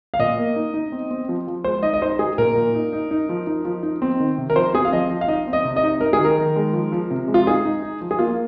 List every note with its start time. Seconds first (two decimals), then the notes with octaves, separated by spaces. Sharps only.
0.14 F5
0.19 A#2 D#5
0.38 A#3
0.56 D#4
0.74 D#4
0.92 C4
1.11 C4
1.29 F3
1.47 F3
1.64 G#3 C5
1.83 D#4 D#5
1.94 D#5
2.02 D#4 C5
2.19 D#4 G#4
2.38 A#2 A#4
2.56 A#2
2.75 D#4
2.93 D#4
3.11 D#4
3.29 F3
3.47 D#4
3.65 F3
3.83 D#4
4.02 C4
4.20 D#3
4.38 C3
4.50 A#4
4.55 F3 C5
4.73 C4 G#4
4.85 F5
4.93 F3 D#5
5.10 F3
5.21 F5
5.28 D#4 D#5
5.47 C4
5.53 D#5
5.65 C3
5.76 D#5
5.83 D#4
6.01 D#4 A#4
6.13 G#4
6.19 D#3
6.25 A#4
6.38 D#3
6.56 G#3
6.73 F3
6.92 F3
7.11 C3
7.28 G#3
7.34 F4
7.46 D#4 G#4
7.65 D#4
7.83 D#4
8.01 F3
8.11 G#4
8.19 A#3 F4